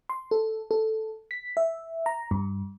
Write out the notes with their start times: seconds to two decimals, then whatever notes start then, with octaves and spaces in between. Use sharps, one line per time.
0.09 C6
0.31 A4
0.71 A4
1.31 B6
1.57 E5
2.06 A#5
2.31 G2